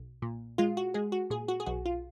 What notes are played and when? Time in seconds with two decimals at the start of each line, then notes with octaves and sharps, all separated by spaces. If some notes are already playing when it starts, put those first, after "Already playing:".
Already playing: B1
0.22 A#2
0.58 G#3 F4
0.77 F#4
0.94 G#3 G#4
1.12 F#4
1.30 A#2 G#4
1.48 F#4
1.60 G#4
1.66 B1 F#4
1.86 F4